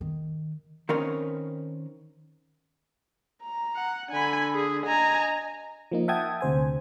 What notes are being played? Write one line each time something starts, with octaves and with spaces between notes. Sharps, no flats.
D#3
D#3 C4 C#4 D#4 A#4 B4
A#5
F#5
D3 G#5 B5
G#4
D#5 G#5 A#5
F3 A#3 D#4
E5 F#5 G5 A5 D#6 G#6
D2 C3 C5 G#5